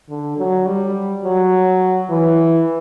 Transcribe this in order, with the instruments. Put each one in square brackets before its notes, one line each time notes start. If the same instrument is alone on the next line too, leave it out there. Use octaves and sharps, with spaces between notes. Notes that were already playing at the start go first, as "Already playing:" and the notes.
[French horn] D3
F#3
G3
F#3
E3